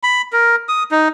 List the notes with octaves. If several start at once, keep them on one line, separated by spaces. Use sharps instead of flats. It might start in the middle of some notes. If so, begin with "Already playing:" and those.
B5
A#4
D#6
D#4